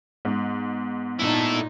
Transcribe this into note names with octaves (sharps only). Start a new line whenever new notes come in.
G#2 B3
A#2 D#4 E4 A4